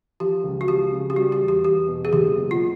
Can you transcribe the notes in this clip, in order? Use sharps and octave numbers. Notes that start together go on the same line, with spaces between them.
F3 G4
C#2
F#4
F3 G4
C#3
G4
G3 F#4
G4
E2
G4
E2 G4
B2
G#4
F#1 G4
B2
F4